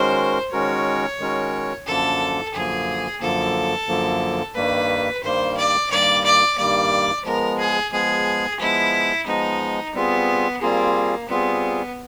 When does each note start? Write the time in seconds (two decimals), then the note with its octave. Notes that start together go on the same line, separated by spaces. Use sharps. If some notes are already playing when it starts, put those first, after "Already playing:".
Already playing: D#3 G#3 C#4 F#4 A#4 C5
0.52 D#3 G#3 C#4 F#4 A#4 C#5
1.19 D#3 G#3 C#4 F#4 A#4
1.87 F#2 D3 F3 A#3 A4
2.54 F#2 D3 F3 A#3 G#4
3.21 F#2 D3 F3 A#3 A4
3.88 F#2 D3 F3 A#3
4.56 G2 D#3 G3 A#3 B4
5.22 G2 D#3 G3 A#3 C5
5.57 D5
5.90 G2 D#3 G3 A#3 D5
6.24 D5
6.57 G2 D#3 G3 A#3 D5
7.24 F3 G#3 B3 A#4
7.59 G#4
7.92 F3 G#3 B3 G#4
8.59 F3 G#3 B3 E4
9.26 F3 G#3 B3 D#4
9.94 G3 B3 C4 F4 G#4
10.61 G3 A#3 C4 F4 G#4
11.29 G3 B3 C4 F4 G#4